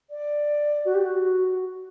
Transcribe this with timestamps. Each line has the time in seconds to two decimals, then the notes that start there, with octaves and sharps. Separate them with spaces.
0.10 D5
0.85 F#4
0.94 G4
1.02 F#4